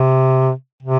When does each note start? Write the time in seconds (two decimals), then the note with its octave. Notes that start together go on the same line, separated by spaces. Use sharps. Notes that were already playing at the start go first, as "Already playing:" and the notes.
Already playing: C3
0.83 C3